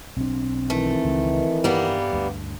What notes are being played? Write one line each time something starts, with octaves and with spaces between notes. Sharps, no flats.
B1 C4 D4
D#3 E3 A3
C#2
G2 G3 A#3 B3
D2 G2